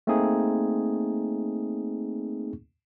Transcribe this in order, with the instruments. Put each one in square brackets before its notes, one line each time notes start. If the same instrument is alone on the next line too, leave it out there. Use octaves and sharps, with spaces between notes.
[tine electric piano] A3 A#3 C4 D#4 G#4